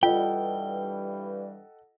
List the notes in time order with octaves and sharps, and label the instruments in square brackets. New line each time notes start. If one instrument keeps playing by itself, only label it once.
[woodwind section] G2 E3 G3 [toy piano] F4 [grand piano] A4 D#5 F#5 [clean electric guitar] G5